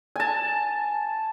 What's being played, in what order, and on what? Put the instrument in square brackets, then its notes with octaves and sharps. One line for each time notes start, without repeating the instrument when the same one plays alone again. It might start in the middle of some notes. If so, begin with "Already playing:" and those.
[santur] G#5 A5